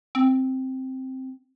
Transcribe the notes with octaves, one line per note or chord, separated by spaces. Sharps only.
C4